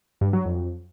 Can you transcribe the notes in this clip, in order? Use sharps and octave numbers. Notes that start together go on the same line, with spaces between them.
G2
F#3
F2